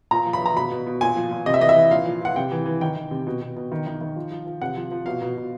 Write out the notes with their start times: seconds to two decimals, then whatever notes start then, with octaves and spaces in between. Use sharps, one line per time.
0.11 A#2 A#5
0.26 F3
0.33 B5
0.41 F3 A#5
0.56 B2 B5
0.71 B2
0.86 B2
1.01 A#2 G#5
1.17 F3
1.31 A#2
1.46 C3 D#5
1.54 E5
1.61 E3 D#5
1.69 E5
1.76 E3
1.91 A#2 F5
2.06 F3
2.21 F3 F#5
2.36 C3 G5
2.51 E3
2.66 E3
2.81 D#3 G5
2.96 D#3
3.11 C3
3.27 B2
3.41 B2
3.56 B2
3.72 D#3
3.87 D#3
4.01 D#3
4.16 F3
4.31 F3
4.47 F3
4.61 C3 F#5
4.76 F3
4.91 F3
5.06 B2 F5
5.22 B2
5.37 B2